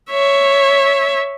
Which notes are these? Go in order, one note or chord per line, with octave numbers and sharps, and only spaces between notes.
C#5 E5